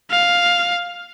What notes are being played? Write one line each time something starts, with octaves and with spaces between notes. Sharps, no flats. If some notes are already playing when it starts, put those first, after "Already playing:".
F5